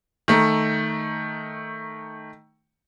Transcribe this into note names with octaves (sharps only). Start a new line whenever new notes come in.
D#3 A3